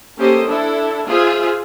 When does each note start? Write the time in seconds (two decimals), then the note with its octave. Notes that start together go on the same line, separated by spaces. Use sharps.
0.18 A#3 C#4 G4 A4 C5 D#5
0.47 D4 E4 A4
1.07 F4 G#4 C5 E5